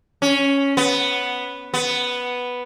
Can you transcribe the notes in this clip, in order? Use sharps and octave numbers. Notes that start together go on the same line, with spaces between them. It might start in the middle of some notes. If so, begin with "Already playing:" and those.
C#4
B3
B3